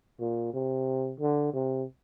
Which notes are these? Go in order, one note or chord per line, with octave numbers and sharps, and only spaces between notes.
A#2
C3
D3
C3